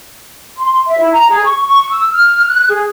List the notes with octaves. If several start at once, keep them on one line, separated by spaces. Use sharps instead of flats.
C6
E5
E4
A#5
G#4
C#6
C#6
E6
F6
F#6
G#4